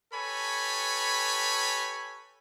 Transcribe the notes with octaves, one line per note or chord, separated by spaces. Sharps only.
G4 A4 B4 C#5 G#5 B5